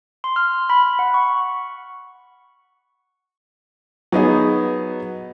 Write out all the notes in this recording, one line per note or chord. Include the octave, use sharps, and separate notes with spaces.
C6
F6
B5
F#5
C#6
F#3 B3 D#4 G#4